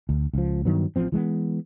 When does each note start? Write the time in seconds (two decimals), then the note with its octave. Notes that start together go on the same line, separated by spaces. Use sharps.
0.09 D2
0.33 C#2 F3
0.65 G2 D#3 F#3 B3
0.96 A1 F3 C4
1.12 E3 G#3 A#3 B3